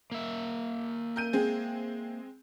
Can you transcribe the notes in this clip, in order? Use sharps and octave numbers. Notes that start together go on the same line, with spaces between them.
A#3 E5
A#4 G6 D#7
G#3 C4 G#4